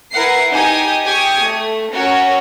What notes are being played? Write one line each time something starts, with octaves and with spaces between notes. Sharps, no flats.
E4 A#4 B4 F#5 C7
D#4 G4 G#5 D#6
G4 G#5 C#6 D#6 G#6
A3
C#4 F#4 A#4 C#5